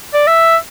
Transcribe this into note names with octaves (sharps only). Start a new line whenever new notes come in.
D5
E5